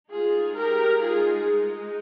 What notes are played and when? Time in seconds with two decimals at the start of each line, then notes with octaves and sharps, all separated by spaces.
0.13 G#3 D#4 F4 G#4
0.58 G4 A#4
1.02 F4 G#4